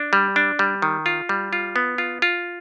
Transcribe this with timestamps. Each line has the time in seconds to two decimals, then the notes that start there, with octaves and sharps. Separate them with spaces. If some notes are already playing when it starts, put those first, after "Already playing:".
Already playing: D4
0.13 G3
0.36 D4
0.59 G3
0.82 D#3
1.06 F4
1.29 G3
1.53 F4
1.76 B3
1.98 F4
2.22 F4